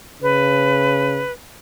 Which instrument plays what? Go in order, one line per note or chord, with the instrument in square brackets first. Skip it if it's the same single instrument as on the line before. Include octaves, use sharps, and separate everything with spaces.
[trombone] C#3 [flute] B4